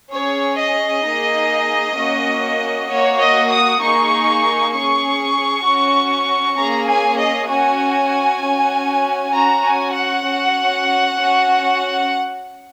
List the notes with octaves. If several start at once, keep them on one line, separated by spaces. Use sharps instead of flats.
C#4 G#4 C#5
D#5
A#3 D#4 G#4
A#3 C#4 F#4
A#3 F#4 C#5
D#5
D#6
A#3 D#4 G#4 C#6
C#4 G#4 C#6
C#4 F#4
A#3 C#4 G#4 A#5
G#5
D#5
C#4 F#4 G#5
C#4 F#4
C#4 F#4 A#5
G#5
F#5
C#4 F#4
C#4 F#4